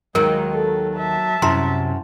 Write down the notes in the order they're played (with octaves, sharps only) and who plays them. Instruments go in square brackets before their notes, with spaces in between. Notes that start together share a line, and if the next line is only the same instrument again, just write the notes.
[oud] D#2 D#3 [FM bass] F#3 [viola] G#3 [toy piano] A#4
[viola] A4
E5 A5
[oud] F#2 [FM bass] C3 [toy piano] E4 A#5 C6